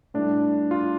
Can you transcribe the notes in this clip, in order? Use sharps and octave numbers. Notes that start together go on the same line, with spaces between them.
A2 G3 D4
F4